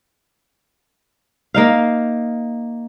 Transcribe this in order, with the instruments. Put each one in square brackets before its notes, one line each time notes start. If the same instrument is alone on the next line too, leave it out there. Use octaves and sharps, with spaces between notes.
[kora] A#3 D#4 F5